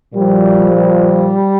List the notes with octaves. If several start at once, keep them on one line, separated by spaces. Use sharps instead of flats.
A#2 F3 G3
G3